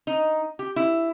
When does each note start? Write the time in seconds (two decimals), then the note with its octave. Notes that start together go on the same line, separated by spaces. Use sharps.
0.07 D#4
0.59 G4
0.76 E4